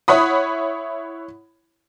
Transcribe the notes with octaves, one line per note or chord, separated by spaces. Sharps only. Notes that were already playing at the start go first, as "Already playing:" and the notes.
E4 C#5 F#5 B5 D#6